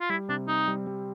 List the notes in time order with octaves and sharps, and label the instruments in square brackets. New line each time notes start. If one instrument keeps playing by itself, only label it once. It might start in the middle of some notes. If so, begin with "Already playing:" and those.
[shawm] F4
[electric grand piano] G3 [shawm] E4
[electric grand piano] C3 [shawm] D4
[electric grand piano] C4 [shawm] D#4
[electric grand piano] G3
G3